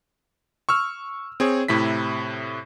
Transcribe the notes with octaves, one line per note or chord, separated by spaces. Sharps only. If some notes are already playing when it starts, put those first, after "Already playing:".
C#6 E6 F6
C4 G#4 C#5
A2 C3 E4 B6